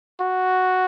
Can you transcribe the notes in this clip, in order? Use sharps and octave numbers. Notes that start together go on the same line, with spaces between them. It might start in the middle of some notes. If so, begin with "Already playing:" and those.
F#4